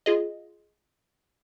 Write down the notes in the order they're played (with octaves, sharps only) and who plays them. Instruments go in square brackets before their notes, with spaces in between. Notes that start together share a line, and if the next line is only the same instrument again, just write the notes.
[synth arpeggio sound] F4 G#4 D#5